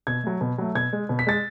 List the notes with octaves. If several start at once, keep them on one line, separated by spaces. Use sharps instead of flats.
B2 G#6
F#3 A3
B2
F#3 A3
B2 G#6
G#3
B2
B6
G#3 A6